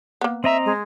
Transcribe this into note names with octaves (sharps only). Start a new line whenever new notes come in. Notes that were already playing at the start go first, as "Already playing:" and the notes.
A#3 B3
C4 D#5 E5 A#5
G#3